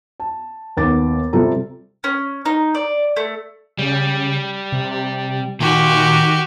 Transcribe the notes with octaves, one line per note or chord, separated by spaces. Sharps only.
A5
D#2 B3 D6 A6
C3 G3 F4 A4 A#5
C#4
D#4
D5
A3
C#3 G3
C3
A#2 D#3 F#4 G4